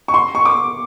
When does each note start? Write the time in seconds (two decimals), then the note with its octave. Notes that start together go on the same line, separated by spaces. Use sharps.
0.08 C#6
0.14 C6
0.35 C#6
0.45 D6